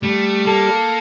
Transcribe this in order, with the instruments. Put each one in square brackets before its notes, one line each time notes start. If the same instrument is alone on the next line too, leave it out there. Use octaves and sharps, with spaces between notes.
[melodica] G3 [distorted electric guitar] A3
[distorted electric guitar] A#3 [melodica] A4